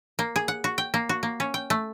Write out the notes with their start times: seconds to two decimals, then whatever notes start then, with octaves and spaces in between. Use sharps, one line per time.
0.19 A#3
0.36 G#4
0.48 F#5
0.64 F#4
0.78 G5
0.94 A#3
1.09 F#4
1.23 A#3
1.40 C#4
1.54 G5
1.70 A3